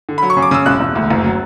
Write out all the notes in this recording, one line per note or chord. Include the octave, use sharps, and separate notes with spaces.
D3
F#3 B5
C#6
C#3
D6
C#3 E6
E1 F#6
E1
D2
F#1
F#3